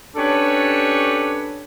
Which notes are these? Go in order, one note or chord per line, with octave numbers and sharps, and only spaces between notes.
C#4 D4 G4 A4 B4 C#5